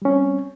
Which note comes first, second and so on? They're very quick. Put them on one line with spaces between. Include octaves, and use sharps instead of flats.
G3 C#4 C4